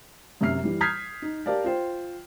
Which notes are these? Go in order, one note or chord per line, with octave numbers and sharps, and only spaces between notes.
F#2 C3 E5 F6 C7
E3 G3
D#6 F6 G6 G#6 B6 C7
D#4
G4 A#4 D5 F5 A5
F4 C5 G5